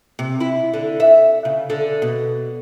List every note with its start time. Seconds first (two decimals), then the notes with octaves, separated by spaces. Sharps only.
0.19 C3
0.40 E4
0.74 D3
1.00 E5
1.45 C#3
1.70 D3
2.02 B2